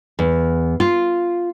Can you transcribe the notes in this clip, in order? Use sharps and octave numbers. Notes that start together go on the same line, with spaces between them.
E2
F4